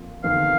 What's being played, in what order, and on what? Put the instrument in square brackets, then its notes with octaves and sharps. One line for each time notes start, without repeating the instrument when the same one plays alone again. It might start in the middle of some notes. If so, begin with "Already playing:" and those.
Already playing: [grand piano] F2 A#3 F4
[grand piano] G1 F2 D#3 C4 [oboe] F5